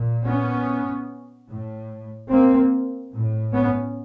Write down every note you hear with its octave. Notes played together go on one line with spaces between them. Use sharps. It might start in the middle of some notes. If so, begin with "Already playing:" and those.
Already playing: A#2
B3 C#4
A2
A#3 C4
A2
B3 C#4